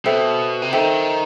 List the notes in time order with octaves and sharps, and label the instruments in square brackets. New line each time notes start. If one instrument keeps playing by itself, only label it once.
[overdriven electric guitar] B2 [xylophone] A4 C5 E5 G5
[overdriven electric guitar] C3
[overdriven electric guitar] D#3 [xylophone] A4 C5 E5 G5